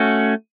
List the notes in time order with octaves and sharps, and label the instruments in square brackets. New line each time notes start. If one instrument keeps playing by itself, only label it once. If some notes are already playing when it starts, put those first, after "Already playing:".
Already playing: [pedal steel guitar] A3 C#4 F#4